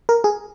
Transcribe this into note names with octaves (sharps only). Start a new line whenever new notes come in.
A#4
G#4